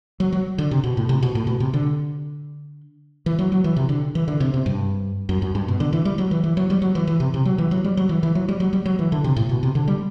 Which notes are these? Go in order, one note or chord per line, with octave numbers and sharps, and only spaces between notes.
F#3
F#3
D3
C3
B2
A2
C3
B2
A2
B2
C3
D3
E3
F#3
F#3
E3
C3
D3
E3
D3
C3
C3
G2
F#2
F#2
G2
B2
D3
E3
G3
F#3
E3
E3
F#3
G3
F#3
E3
E3
C3
C3
F#3
E3
F#3
G3
F#3
E3
E3
F#3
G3
F#3
G3
F#3
E3
D3
C3
A2
B2
C3
D3
G3